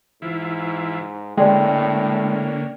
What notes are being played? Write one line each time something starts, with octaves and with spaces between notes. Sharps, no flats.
G#2 E3 E4 F4
A2 D3 G#3 A#3 C#4 D5 G5